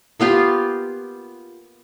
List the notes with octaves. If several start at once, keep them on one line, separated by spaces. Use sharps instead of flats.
A#3 B3 F4 G4